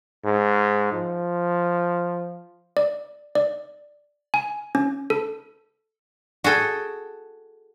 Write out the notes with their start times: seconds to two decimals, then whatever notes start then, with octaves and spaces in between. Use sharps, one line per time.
0.25 G#2
0.93 F3
2.77 D5
3.35 D5
4.34 G#5
4.75 C#4
5.10 A4
6.44 F#4 G#4 A4 G5